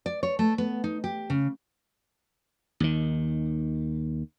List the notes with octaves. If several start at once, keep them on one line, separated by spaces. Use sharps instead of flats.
D5
C#5
A3
B3
D#4
G4
C#3
D#2 D#3